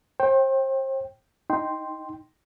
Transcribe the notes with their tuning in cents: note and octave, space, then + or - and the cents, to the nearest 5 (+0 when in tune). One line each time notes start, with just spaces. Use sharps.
C5 +35 G5 +0
D#4 +0 G5 +0 C6 +0